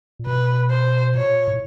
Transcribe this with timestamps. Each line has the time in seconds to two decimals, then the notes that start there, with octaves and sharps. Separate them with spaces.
0.19 A#2
0.26 B2 B4
0.70 C5
1.15 A#2 C#5
1.48 A2